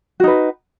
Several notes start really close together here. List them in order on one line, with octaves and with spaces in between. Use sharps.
F#4 D#4 B4